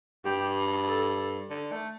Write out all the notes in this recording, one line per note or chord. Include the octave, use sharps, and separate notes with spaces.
G2 G4
A4
D3
A3